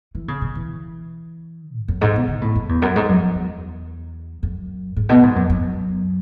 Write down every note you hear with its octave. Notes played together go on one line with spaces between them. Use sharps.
E3
C#3
B2
E3
G#2
F#2
G#2
B2
C#3
A2
F#2
E2
F#2
G#2
F#2
F#2
E2
F#2
G#2
B2
G#2
F#2
F#2